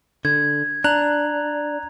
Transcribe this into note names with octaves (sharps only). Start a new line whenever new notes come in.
D3 G#6
D4 A#5 F#6 F7